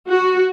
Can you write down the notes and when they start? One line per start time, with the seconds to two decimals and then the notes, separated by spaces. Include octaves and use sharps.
0.08 F#4